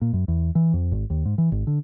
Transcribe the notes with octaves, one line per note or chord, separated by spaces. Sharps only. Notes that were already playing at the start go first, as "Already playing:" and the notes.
A#2
F#2
E2
E3
F2
G#1
D#2
G#2
E3
G#1
D3